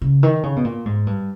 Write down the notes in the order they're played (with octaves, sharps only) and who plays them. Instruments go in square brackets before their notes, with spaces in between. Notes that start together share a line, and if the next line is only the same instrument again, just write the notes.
[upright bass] C#3
D#3
C#3
B2
A#2
G#2
G2